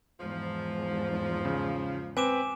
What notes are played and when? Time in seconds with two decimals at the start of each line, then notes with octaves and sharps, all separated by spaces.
0.20 E2 G#2 F3
1.45 C#3
2.17 C4 B4 G#5 D6 E7